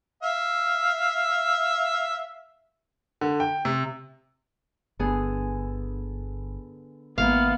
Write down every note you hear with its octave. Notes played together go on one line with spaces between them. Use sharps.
E5 F5
D3
G5
C3
G1 D3 B3 G#4
G#1 G#2 A#3 B3 E4 F5